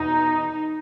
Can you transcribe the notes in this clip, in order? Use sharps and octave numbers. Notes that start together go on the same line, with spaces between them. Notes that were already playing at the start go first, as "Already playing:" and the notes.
Already playing: E2 B2 D#4